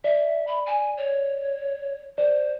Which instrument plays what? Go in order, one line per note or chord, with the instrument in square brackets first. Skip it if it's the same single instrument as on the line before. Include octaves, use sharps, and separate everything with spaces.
[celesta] D5 [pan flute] E5
[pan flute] B5
G#5
C#5
[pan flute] C5 [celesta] D5